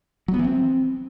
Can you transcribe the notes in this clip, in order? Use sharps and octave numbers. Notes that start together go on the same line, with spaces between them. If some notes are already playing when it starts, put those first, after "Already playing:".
F#3
B3
E3
C4